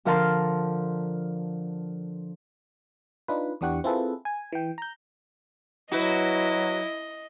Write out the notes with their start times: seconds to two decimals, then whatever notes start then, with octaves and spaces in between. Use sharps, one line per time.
0.05 D3 F3 A#4 F5 A5 C6
3.28 D4 D#4 F4 B4
3.61 E2 E3 D4 G4 F#5 C#6
3.84 C4 E4 F4 G#4 A4 B4
4.25 G#5
4.53 E3 G5
4.78 A#5 G6
5.92 F#3 E4 F#4 B4 D#5